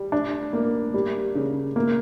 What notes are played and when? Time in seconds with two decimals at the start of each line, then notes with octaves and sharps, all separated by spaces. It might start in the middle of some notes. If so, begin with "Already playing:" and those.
Already playing: G3
0.12 D4
0.53 A#3
0.94 G3
1.35 C#3
1.76 A#3